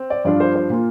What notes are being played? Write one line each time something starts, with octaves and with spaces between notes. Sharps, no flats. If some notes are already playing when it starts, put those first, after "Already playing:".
Already playing: C4
D5
G2 F3 D4 F4 D5
C5
C5
A#2 A#3 F4